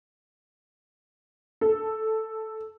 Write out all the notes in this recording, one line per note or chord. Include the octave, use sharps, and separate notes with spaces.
A4